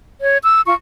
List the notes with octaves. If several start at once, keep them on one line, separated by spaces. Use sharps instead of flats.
C#5
E6
F4 C#6